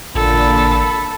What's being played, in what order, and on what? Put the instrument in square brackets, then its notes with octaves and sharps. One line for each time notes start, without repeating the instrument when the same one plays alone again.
[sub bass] A1 [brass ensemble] A#2 D3 [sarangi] A4 [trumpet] B5